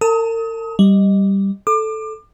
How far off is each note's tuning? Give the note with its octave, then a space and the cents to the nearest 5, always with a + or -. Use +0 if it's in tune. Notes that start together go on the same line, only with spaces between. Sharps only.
A#4 -45 A5 +0 D#6 +30
G3 +0 D#5 +0
A4 -5 D6 +30